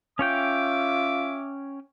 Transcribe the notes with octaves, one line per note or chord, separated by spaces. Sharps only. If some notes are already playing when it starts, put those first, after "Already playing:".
C#4 F4 C#5 E5 G5 D6